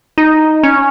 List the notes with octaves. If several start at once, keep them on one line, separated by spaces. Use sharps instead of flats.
D#4
C#4